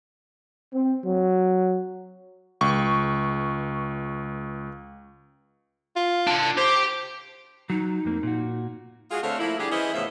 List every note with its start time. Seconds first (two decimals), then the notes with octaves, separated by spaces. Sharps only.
0.73 C4
1.04 F#3
2.61 C#2 C#6
5.96 F4
6.27 D4 C6
6.57 G4 C5
7.70 F#3 D#4
8.05 F2 A#3 C4
8.23 A#2 F#4
9.11 G#3 F4 F#4 G#4
9.22 D3 A3 C4 C#5 E5 F5
9.39 F3 A3 A#3 E4
9.58 D3 G3 D4 G4 G#4
9.71 E3 C#4 E4 G#4 C5 D#5
9.94 D#2 A2 C#3 F3 B3 E5